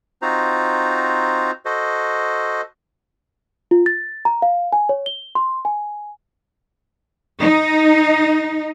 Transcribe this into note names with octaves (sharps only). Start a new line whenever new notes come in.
C4 D#4 F4 F#4 C5 A#5
F#4 A4 C5 D#5
F4
A6
A#5
F5
G#5
C#5
G7
C6
G#5
D#4